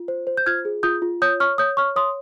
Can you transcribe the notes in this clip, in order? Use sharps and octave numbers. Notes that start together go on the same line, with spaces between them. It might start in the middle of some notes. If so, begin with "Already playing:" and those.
Already playing: F4
C5
C5
G6
F4 F6 G#6
G#4
F4 D#6 G6
F4
C#5 D#6 G6
C#5 C#6 F6
C#5 D#6 G6
C#5 C#6 F6
C#5 C6 D#6